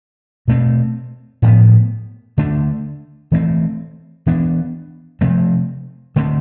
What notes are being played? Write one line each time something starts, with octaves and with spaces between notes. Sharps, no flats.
B2 A3 C4
A2 F3 B3
D3 A3 D4
E3 A3 C4
E3 B3 D4
C3 F3 A3 C4
D3 A3 C4